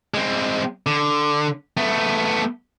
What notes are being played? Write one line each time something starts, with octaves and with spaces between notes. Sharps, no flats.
G#3 C4
D3
A3 B3